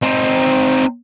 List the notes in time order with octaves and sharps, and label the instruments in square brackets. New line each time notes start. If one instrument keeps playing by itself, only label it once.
[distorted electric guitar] C4 D#4